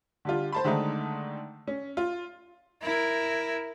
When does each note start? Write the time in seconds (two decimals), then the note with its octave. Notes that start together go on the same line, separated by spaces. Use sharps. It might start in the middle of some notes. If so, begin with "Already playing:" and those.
0.25 D3 G3 F4
0.52 C5 A5 B5
0.64 D3 D#3 G#3 A3 D#4
1.68 C#4
1.97 F4
2.82 E4 A#4